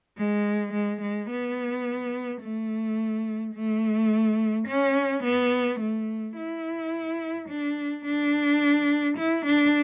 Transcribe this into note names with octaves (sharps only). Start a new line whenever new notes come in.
G#3
G#3
G#3
B3
A3
A3
C#4
B3
A3
E4
D4
D4
E4
D4